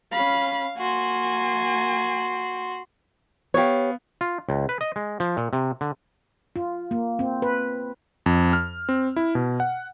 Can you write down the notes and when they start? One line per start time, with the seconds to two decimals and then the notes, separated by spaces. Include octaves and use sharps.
0.12 C#4 F5 B5
0.78 A#3 F#4 G#5 C6
3.54 B3 G4 C#5 F5
4.21 F4
4.49 C#2
4.69 B4
4.81 D#5
4.96 G#3
5.20 F3
5.37 A#2
5.53 C3
5.81 D3
6.56 F4
6.91 A#3
7.19 C4
7.42 B4
8.26 F2
8.53 F6
8.89 C4
9.16 E4
9.35 B2
9.60 F#5